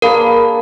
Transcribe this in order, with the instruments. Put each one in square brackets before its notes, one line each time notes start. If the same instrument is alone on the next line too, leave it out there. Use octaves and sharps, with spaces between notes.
[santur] A#3 D4 G#4 B4 [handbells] A#4